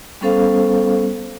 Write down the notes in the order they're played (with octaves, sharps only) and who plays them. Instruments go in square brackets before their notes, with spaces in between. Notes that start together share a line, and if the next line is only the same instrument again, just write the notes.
[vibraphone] G3 B3 C#4 A4 C5 F5